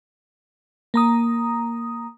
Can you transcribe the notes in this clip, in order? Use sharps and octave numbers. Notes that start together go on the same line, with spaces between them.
A#3 A#5 D#6